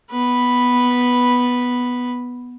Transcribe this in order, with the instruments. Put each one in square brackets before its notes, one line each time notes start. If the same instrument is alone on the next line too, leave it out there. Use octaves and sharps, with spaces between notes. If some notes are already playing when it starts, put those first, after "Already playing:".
[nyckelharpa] B3 B4